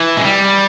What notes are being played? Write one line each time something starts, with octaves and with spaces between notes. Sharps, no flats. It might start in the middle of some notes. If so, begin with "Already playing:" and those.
Already playing: E3
G#3
G3